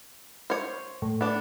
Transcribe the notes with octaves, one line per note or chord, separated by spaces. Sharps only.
C5 C#5
A2
B3 D4